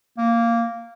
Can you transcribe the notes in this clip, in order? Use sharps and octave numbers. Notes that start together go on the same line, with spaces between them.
A#3